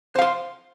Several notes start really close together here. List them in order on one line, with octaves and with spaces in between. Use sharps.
C5 F5 C6